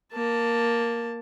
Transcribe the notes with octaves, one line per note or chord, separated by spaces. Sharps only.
A#3 A5